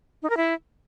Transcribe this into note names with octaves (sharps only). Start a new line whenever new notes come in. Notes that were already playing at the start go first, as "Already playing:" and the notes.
D#4
A#4
E4